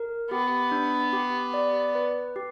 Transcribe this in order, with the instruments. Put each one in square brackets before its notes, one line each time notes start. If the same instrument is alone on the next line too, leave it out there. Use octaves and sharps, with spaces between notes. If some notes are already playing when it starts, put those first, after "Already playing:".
Already playing: [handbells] A#4
[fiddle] B3 [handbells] G4
[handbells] D4
G4
D5
B4
G4